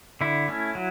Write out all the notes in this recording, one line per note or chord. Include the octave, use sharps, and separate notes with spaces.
D3 E4
A3 C#4
F#3